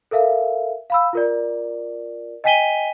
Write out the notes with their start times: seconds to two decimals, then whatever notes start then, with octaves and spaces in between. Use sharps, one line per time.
0.11 A4 A#4 E5 F5
0.90 F5 B5 E6
1.13 F4 A#4 D5
2.44 D#5 G5 G#5 B6 D#7 G7